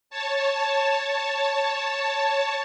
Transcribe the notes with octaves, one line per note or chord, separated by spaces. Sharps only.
C#5 A5